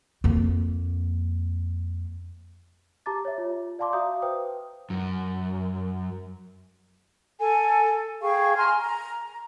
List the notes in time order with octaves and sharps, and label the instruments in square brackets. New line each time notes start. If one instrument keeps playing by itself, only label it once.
[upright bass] F2 A#3
[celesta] G4 A5 A#5 D6 A6
C#5 E5
F4
D5 F5 A5 C6 D6
F#4 E5 F5 A#5 D#6 G6
B4 C5 G5 D#6
[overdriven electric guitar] F#2
[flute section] A4 G#5
G#4 F5 G5 C#6
G#5 A#5 C6 F6
A#5
A#5